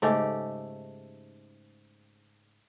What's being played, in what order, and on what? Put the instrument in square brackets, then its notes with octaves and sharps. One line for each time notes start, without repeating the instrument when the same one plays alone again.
[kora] G#2 C#3 A3 G4